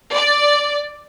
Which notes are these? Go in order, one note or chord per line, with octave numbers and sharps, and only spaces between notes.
D5